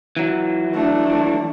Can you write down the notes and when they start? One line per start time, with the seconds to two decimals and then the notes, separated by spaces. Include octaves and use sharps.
0.17 E3 F#3
0.75 A3 D4